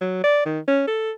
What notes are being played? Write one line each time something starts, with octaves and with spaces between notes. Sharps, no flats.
F#3
D5
D#3
C#4
A4